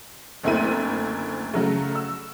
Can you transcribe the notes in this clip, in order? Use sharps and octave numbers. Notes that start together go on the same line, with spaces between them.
F#1 D2 C4 E4 A#4 D#7
C#3 F#3 A3
E6